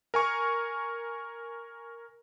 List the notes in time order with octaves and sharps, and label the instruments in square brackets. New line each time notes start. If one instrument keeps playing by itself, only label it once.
[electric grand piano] A#4 G#5 C#6